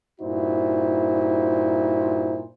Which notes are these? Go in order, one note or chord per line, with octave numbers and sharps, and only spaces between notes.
G2 A#2 D#4 E4 F#4 C5